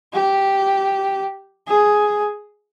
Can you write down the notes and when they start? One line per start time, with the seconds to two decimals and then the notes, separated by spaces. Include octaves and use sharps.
0.14 G4
1.68 G#4